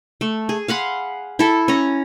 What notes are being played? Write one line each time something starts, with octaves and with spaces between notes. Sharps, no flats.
A3
G#4
F5 F#5 B5 C6
E4 A4
C#4 A#5